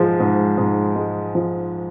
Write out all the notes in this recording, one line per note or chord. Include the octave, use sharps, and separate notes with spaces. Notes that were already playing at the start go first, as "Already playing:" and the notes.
Already playing: G#2 F3 G#3
G#2
G#2
G#3
F3